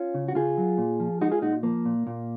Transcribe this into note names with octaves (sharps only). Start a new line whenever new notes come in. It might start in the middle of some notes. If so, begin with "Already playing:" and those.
Already playing: C#4 F4
C#3
F#4
C#3 F4 G#4
F#3
A#2
F3
G#3 D#4 F#4
F4 G#4
A#2 D#4 F#4
F3 A#3
A#2
A#2